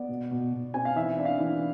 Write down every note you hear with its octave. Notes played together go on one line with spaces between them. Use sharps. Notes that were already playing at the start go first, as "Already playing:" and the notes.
Already playing: B3 D5
B2
B2
B2
C4 G#5
F5
E3 E5
D4
F5
E3